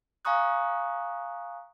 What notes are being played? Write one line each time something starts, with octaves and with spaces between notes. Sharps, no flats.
F5 G#5 A#5 C#6 D#6 F#6